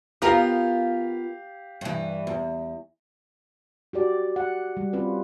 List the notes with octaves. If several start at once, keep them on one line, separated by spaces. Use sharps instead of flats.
B3 F4 G4 A#4 F5
G2 E3
E2
F#4 G4 D5
F#5
G3
C4 C#4 F4 G4 B4